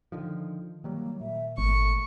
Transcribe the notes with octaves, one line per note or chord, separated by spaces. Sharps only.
D3 D#3 F3
D#3 F#3 G3 A#3
A#2 E5
G#1 A3 C#6